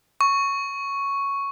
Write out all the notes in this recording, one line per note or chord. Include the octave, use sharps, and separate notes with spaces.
C#6